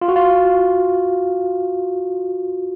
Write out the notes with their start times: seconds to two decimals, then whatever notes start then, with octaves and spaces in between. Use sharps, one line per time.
0.01 F4
0.08 F#4
0.16 F4